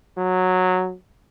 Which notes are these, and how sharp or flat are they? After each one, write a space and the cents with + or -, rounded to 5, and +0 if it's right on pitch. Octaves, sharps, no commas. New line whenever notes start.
F#3 -10